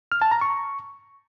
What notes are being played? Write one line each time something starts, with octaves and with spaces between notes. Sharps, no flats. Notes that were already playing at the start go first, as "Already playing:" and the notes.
F6
A5
A#5
C#6